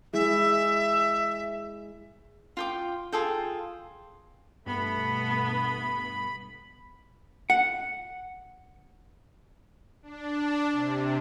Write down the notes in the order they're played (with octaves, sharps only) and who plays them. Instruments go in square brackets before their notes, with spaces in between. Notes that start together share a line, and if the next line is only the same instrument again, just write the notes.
[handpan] G#3 E4 G#4 [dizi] E5
[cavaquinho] F4 G5 D6
F4 G#4 A4 G5
[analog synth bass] G2 [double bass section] B2 A3 [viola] B3 [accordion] B5
[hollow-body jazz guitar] F#5
[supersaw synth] D4
C3